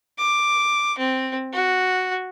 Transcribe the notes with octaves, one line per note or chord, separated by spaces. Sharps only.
D6
C4
F#4